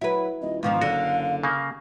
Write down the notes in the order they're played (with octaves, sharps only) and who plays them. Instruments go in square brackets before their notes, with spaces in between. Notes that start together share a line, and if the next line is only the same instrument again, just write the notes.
[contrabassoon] F#3 [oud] E4 B4
[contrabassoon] D#1 [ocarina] D#5
[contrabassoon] E1 [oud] G#2 D#3 F3 [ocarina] F5
[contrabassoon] F#1 [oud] D3 [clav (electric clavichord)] F#4
[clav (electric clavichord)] C#3 A#3